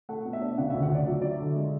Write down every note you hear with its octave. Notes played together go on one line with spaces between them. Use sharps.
A3 F#5
B2
E5
D4
C#3 F#5
E5
D2
F#5
D2 D5
F#3 E5
F#3 D5
E5
D3
G#3